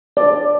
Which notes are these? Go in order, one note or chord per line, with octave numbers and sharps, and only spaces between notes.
D5